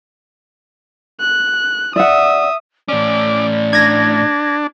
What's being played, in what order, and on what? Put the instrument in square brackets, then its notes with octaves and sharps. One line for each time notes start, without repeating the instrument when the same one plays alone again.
[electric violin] F#6
[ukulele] D5 F#5 [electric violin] E5 D#6
[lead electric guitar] A2 C#4 [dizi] D5 [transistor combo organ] D6
[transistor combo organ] D4 [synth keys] G#6 A#6